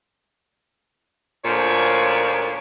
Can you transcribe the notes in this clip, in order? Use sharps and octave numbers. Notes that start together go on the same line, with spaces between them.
D2 A#2 F3 C#4 C#5 D5